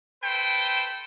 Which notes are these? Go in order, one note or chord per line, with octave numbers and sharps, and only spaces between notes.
A4 B4 C5 G5